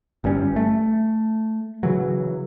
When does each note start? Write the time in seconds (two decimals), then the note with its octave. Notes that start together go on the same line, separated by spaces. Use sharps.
0.24 G1 G2 G3 C#4
0.56 A3
1.83 C#3 E3 F#3